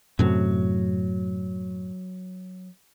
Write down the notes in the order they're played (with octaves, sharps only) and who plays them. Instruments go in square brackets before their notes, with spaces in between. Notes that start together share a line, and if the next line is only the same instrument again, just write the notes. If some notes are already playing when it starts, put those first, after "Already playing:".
[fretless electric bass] F#2 A2 C3 [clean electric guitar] F#3